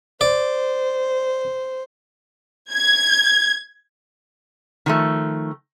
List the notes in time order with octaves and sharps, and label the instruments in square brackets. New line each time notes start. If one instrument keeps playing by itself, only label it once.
[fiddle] C5 [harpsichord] D5
[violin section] G#6
[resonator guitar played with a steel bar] D#3 F3 A3